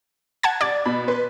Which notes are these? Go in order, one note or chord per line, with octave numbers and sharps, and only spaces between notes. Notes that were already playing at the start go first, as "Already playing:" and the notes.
F#5 A5 G#6
D5 G#6 A6
B2 B5
B4 C6